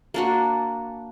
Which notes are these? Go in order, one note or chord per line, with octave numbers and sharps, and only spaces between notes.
A#3 D4 F#4